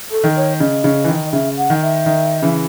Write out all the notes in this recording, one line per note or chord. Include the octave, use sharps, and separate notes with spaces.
A4
D#3
C#5
C#3 D#5
C#3
E3
D#3
D#5
C#3 E5
F#5
D#3
E5
D#3
C#3 E3